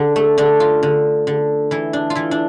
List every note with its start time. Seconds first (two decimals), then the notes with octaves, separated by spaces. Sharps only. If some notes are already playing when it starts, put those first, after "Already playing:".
Already playing: D3
0.16 A3
0.38 D3 D4
0.60 F4
0.83 D3
1.27 D3
1.71 E3 E4
1.93 D4
2.10 F4
2.15 E3 E4
2.31 D4